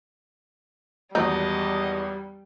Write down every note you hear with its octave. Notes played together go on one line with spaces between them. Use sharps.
G#1 E2 F#3 G3 D#4 D#5 A5